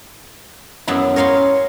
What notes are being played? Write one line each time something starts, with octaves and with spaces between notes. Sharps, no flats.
F#2 B3 E4
A#4 C#5 F5 G#5 C6